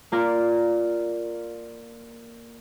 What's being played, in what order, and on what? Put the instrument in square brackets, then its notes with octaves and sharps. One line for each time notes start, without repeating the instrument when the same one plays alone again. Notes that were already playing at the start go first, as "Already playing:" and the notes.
[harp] A#3 F4 A#4 D5